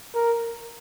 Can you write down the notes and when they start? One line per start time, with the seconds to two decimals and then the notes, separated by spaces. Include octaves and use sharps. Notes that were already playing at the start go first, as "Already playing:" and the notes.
0.15 A#4